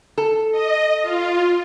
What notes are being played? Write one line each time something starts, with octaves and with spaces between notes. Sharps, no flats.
A4
D#5
F4